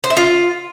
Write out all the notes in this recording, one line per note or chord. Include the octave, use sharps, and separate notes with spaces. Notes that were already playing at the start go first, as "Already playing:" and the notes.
C5
E5
F4